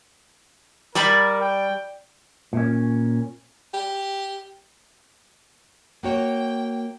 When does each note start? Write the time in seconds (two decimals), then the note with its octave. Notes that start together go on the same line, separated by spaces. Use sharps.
0.95 G3 A#4 D5 B5 C#6
1.40 G5
2.53 A#2 C#4
3.74 G4
6.03 A#3 F#4 C#5 G5